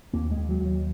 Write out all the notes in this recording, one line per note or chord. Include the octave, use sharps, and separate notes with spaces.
D#2 A#3
G#3
D#2
F#3
D#2
F#3